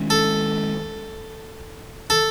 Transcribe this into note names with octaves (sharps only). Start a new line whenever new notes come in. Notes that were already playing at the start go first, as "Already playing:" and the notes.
Already playing: D#3 G#3 C#4
A4
A4